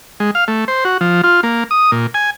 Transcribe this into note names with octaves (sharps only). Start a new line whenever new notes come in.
G#3
F5
A3
C5
F#4
F3
F4
A#3
D#6
A#2
G#5